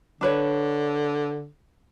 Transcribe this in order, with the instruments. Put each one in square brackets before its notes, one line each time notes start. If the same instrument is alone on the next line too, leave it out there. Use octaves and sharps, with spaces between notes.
[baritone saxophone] D3 [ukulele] D4 B4 C#5